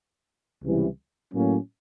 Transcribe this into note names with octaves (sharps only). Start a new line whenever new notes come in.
C#2 C3 E3 G3
A2 F#3 A#3 C#4